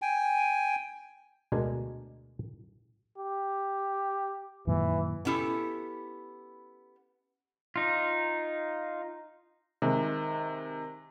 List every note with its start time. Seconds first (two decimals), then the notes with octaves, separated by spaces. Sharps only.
0.02 G5 G#5
1.52 D2 B2 G#3 D4 A#4 G#5
3.18 G4
4.67 F#2 A#2 D#3 E3
5.25 B3 C#4 E4 G4 A4
7.76 D#4 F4
9.82 C3 D#3 G#3